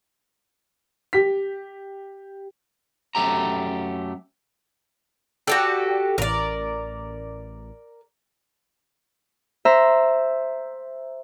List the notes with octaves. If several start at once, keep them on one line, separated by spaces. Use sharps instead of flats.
G4 B6
F#2 A3 G4 A#5
F#4 G4 A4 D5 G5
A1 A#4 D5
C5 E5 A#5